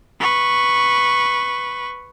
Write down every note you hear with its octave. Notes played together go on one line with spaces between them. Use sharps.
B4 C#6